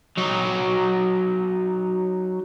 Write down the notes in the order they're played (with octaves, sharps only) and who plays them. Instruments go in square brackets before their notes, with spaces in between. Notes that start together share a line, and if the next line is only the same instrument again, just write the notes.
[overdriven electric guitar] F#3 D#4